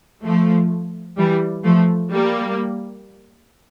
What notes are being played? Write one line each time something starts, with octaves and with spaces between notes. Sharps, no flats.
F3 A3
E3 G3
F3 A3
G3 A#3